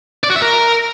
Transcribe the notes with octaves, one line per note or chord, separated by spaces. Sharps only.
D5
F#4
E5
A#4